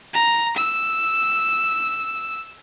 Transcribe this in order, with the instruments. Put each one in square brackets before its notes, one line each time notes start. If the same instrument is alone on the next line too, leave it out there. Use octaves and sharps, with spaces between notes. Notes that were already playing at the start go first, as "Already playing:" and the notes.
[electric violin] A#5
E6